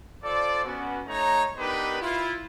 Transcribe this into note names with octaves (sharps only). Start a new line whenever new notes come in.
F4 A4 C5 D5
B3 C#4 F#4
A3 D#4 C#5 A#5
B3 D4 D#4 G4 A#4 B4
E4 F4